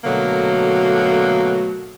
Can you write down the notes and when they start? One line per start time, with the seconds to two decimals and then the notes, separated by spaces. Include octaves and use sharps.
0.04 B2 D3 F#3 A3 A#3